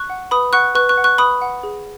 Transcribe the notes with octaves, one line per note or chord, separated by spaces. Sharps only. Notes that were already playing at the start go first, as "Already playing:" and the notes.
Already playing: C#6 F#6
F#5
B4 B5 D#6
F#5 C#6 F#6
B4 C#6 F#6
C#6 F#6
F#5
C#6 F#6
B4 B5 D#6
F#5
G#4